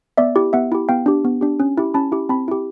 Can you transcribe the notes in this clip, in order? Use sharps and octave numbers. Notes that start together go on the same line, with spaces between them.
B3 D5 E5
E4 G4
B3 E5 F#5
E4 G4
B3 F5 G5
D4 G4
B3
D4 G4
C#4
E4 G4
C#4 A5 B5
E4 G4
C4 A5 B5
E4 G4